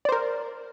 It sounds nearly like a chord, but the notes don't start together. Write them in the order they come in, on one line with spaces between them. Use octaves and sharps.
D5 C5 A#4